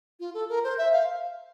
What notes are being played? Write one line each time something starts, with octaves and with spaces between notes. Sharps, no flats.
F4
A4
A#4
C5
E5
F5